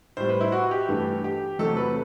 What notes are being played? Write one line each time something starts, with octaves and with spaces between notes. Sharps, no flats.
A2 G3 C5
B4
E4
F#4
G4
G2 E3 A3
G4
E2 C3 F#3 A3 A4
B4